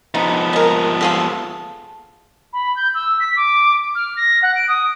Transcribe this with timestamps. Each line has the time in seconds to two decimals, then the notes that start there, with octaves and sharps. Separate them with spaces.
0.15 F3 B3 D#4
0.53 G#3 A#4
1.01 F4 G#4 A4
2.53 B5
2.76 G6
2.94 E6
3.20 B6
3.36 D6
3.95 F6
4.17 A#6
4.43 F#5
4.55 D7
4.68 D#6